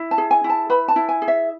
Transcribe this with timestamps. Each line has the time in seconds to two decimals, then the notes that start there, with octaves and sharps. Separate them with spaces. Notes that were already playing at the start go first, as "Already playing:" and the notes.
Already playing: E4
0.11 A5
0.18 G#4
0.31 G#5
0.44 E4
0.50 A5
0.70 B4 B5
0.88 A5
0.96 E4
1.09 G#5
1.22 G#4
1.28 E5